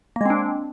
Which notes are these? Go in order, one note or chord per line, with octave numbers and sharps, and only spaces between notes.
G#3 A#3 C4 D4